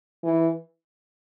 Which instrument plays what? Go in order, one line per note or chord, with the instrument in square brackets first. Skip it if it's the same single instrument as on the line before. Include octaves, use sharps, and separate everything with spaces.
[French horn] E3